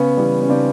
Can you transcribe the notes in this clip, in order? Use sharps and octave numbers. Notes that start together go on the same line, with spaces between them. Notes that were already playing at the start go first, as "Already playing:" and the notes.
Already playing: C#3 B3 C#4
E3 G3
C#4
C#3 C4 D4